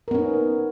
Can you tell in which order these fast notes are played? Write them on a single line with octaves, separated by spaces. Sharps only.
A#4 B3 C#4 D#4